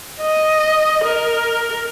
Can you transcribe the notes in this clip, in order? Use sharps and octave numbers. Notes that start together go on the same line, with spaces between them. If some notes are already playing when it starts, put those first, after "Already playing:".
D#5
A#4